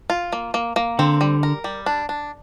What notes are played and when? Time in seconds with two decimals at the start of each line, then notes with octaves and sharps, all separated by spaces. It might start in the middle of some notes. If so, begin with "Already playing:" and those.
0.10 F4
0.32 A#3
0.54 A#3
0.76 A#3
0.99 D3 C4
1.21 G3
1.43 A#4
1.64 G3
1.86 D4
2.09 D4